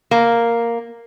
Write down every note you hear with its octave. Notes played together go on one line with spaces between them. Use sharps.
A#3